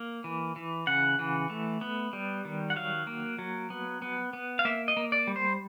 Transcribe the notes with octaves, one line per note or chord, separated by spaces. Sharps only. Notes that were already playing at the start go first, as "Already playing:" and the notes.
Already playing: A#3
E3
E3
C#3 F#5
E3
A3
B3
G3
D#3
F#5
F#3 F5
A#3
F#3
B3
B3
B3
F5
A#3 E5
D#5
A#3
D5
G3
C5